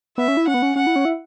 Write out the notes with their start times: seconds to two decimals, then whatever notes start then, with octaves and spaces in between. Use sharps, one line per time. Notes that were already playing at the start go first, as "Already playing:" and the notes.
0.17 B3 E5
0.28 C#4
0.37 E4
0.48 C#4 F#5
0.54 B3
0.62 C#4
0.76 C#4 F#5
0.87 E4
0.96 C#4
1.05 E4